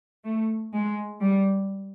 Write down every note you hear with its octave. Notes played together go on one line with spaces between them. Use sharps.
A3
G#3
G3